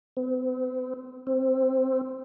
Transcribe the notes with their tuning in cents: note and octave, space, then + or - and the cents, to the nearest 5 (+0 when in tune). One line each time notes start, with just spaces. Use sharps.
C4 -45
C4 +0